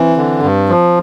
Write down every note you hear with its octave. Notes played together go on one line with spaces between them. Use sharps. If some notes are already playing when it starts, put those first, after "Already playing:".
Already playing: E3 C4
D3
G2
F3